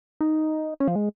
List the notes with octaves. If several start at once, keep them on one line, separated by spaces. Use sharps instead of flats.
D#4
C#4
F3
G#3